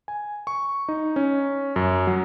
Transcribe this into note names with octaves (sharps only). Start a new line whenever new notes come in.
G#5
C#6
D#4
C#4
F#2
F#3